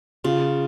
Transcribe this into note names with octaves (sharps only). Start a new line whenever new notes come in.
C#3 F4